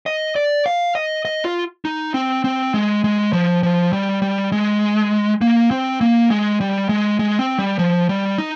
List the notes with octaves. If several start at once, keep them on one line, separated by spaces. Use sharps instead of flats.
D#5
D5
F5
D#5
D#5
F4
D#4
C4
C4
G#3
G#3
F3
F3
G3
G3
G#3
A#3
C4
A#3
G#3
G3
G#3
G#3
C4
G3
F3
G3
D#4